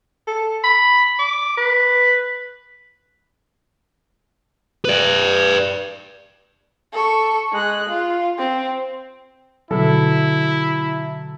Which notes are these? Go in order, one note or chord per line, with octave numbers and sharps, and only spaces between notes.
A4
B5
D6
B4
B4 D5
A4 C#6
G#3 F#6
F4
C4
B2 D3 F#3 E4 A4